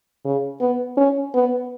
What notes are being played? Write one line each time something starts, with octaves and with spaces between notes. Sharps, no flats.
C#3
B3
C#4
B3